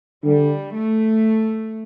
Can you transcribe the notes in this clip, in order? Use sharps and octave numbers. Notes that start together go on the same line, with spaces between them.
D3 G3
A3